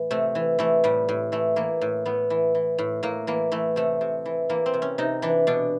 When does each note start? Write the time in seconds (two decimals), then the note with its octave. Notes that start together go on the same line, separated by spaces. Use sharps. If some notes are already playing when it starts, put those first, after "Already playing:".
Already playing: A2 E3
0.11 C3 A3
0.35 E3
0.59 E3 A3
0.84 A2 G3
1.09 A2
1.32 E3 A3
1.56 E3 A#3
1.81 A2
2.06 A2 B3
2.30 E3
2.55 E3
2.78 A2
3.03 A2 A#3
3.27 E3 A#3
3.52 E3 A3
3.76 C3 A3
4.01 C3
4.26 E3
4.49 E3 A#3
4.66 C4
4.74 C3
4.82 C#4
4.98 C3 D#4
5.22 E3 D4
5.47 B2 D4